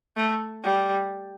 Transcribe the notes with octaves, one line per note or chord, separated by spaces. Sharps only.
A3
G3